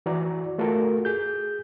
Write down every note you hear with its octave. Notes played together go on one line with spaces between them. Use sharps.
E3 F#4 D5 A#5
A3 F4 F#4 A4 A#4
G#4 G6